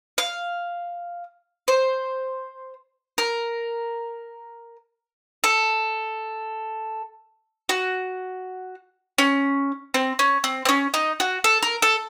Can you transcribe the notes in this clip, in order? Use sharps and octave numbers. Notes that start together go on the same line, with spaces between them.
F5
C5
A#4
A4
F#4
C#4
C4
C#4
C4
C4
C#4
D#4
F#4
A4
A#4
A4